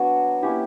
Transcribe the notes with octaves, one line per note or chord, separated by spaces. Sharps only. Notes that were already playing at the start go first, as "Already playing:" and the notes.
Already playing: F#3 B3 D4 F#4 C#5
A#3 C#4 E4 G4